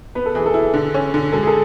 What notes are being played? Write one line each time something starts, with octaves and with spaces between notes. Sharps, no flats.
B3 B4
A4
E3 G#4
A4
E4
D3
C#4
D3
G#3 A4
G#4
A4